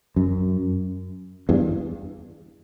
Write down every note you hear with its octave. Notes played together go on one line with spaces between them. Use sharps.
F#2
E2 G2